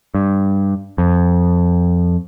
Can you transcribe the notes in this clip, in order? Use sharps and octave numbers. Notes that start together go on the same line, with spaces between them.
G2
F2